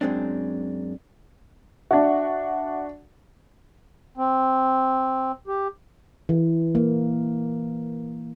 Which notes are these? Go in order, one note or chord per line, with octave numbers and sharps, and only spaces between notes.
F#2 G#3 C4 D4
D4 F#4 E5
C4
G4
E3
A#3